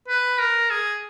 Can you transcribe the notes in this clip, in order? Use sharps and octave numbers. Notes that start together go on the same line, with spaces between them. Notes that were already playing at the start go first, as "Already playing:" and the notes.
B4
A#4
G#4